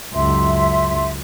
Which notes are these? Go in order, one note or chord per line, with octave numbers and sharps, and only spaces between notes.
C#2 F#2 E5 C6